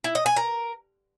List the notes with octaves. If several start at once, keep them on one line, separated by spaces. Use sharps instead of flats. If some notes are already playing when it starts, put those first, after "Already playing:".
E4
D#5
G#5
A#4